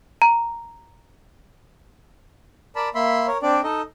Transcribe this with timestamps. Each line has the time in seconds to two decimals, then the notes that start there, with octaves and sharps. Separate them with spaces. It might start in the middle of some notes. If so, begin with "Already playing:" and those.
0.22 A#5
2.76 A#4 D5 A5 B5
2.95 A#3 E5 B5 C6
3.27 A#4 C#5
3.42 C4 D4 D5
3.64 D#4 A4 D#5